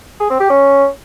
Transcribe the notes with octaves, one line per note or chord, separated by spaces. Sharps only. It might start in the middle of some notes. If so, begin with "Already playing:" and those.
G#4
C4
G4
C#4